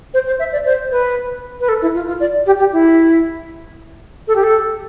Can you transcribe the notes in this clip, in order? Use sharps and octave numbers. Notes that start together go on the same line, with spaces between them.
C5
C5
E5
D5
C5
B4
B4
A4
E4
F4
F4
D5
G4
G4
E4
A4
G4
A4